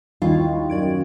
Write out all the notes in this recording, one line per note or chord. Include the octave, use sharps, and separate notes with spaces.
D#2 G3 E4 F4
F#2 D5 G#6 D7